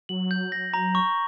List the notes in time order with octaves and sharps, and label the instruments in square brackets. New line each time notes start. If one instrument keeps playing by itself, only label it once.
[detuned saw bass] F#3 [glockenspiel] F#7
[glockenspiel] G6
A#6
A#5
C#6